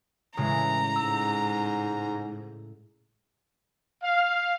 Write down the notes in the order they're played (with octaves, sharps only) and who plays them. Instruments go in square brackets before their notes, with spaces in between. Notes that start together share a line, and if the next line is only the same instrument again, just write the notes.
[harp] A2 C#3 G#3 [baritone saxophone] E3 [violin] A#5
[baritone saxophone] G#2 [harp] E6
[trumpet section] F5